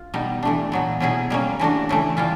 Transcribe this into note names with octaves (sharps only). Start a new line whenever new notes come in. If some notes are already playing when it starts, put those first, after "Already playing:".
Already playing: F4
B2 G3 B3 D#4
E3 A3 D4
A#2 F#3 B3
B2 F#3 B3 E4 G#4
G3 A#3 C#4
E3 A3 D4 F#4
C#3 E3 A3
E3 G3 F4